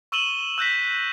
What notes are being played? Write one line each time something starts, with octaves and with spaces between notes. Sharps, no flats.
C#6 E6 D#7 E7 F#7 G7
E6 F#6 G6 A#6 B6